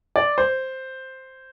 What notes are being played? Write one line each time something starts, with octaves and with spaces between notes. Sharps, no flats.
D5
C5